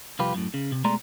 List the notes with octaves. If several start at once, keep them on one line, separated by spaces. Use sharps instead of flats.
C2 F2 F4 G4 B4
F#2 A2
C#3
C3
B2 G#3 A3 D5 A#5 C6